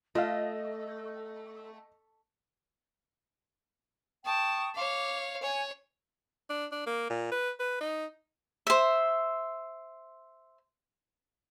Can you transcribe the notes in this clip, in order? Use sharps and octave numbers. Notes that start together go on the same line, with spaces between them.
A3 F4 A4 D#5 F5
G5 A5 C#6 D#6
C#5 F5 D6
C#5 G#5
D4
D4
A#3
A#2
B4
B4
D#4
C5 E5